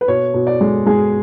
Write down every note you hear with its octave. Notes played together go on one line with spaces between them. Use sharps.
B4
B2 C#5
B2
D5
G#3
G#3 G#4